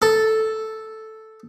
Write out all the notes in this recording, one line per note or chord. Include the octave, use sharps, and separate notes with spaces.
A4